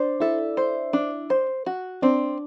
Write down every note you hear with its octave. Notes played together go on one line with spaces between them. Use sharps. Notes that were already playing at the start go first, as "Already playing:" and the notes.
Already playing: D4 C5 D5
E4 A4 E5
C5
D4
C5
F#4
C4 D4 D5